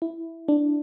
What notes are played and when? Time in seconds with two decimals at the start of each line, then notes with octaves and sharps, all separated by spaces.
0.02 E4
0.48 D4